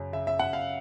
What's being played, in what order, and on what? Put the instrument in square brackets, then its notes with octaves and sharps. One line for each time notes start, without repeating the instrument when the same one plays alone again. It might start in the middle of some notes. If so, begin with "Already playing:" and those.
Already playing: [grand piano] F#2 C#3
C#3 E5
E5
F#2 F#5
F5